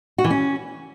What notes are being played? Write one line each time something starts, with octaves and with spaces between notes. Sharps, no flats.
F#4
E3
C#4